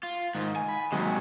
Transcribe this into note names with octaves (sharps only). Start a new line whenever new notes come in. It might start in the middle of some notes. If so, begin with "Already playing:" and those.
F4
G#2 D#3
G#5
B5
D#2 C3 D#3 F#3 G#3